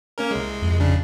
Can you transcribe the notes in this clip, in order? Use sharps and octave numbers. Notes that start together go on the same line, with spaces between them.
A#3 C#4 A#4
C2 G#3
F2
A1 C#3 D4